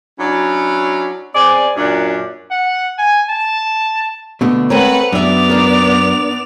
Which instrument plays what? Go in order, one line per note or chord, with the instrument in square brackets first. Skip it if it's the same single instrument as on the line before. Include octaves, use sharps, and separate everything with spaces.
[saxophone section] F#3 C#4 D4 E4
C4 G#4 D5
F#2 A#2 F#3 D4
[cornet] F#5
G#5
A5
[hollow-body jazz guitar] B2 D3 A3
[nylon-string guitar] A3 C4 C#5 [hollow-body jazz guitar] A#4 [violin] B4 F#5
[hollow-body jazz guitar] F#2 [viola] B3 D5 [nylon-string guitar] D4 E5 [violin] F7
[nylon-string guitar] D4 A#4